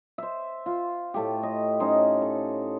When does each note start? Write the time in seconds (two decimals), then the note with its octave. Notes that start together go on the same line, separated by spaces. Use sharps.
0.18 C5 E5
0.66 F4
1.14 A2 A3 G4
1.43 D#5
1.80 C#4 D#4 C5
2.22 A4